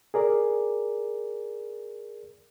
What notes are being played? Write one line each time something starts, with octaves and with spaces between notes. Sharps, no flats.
G#4 A#4 D5